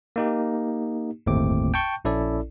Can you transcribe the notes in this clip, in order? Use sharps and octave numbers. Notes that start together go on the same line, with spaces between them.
A#3 D#4 G4
G1 D#2 A2 A3 C4 D6
G5 A5 C#6 G6
A#1 C#4 E4 A4 D5